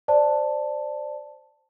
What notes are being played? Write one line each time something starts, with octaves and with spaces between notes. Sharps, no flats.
C5 D5 A5